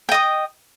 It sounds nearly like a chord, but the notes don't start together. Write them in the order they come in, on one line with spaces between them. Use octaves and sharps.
G5 D#5 D#6